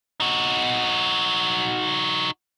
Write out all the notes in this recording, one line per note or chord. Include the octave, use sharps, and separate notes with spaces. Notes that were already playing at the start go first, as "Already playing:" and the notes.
D#4 F#4